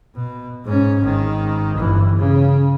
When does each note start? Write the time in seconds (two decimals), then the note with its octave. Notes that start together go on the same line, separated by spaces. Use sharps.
0.15 B2
0.65 G#2 C#4
1.03 G#1 D#3
1.77 G1 E3
2.17 C#3